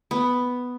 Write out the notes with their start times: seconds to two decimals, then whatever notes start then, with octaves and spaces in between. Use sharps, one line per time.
0.11 B3